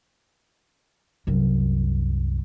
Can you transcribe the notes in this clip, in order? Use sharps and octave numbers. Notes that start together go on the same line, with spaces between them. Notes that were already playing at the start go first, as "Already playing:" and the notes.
C2 F#2